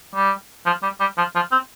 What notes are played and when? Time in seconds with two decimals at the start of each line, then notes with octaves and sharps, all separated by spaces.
0.15 G3
0.66 F3
0.83 G3
1.00 G3
1.18 F3
1.35 F3
1.52 C4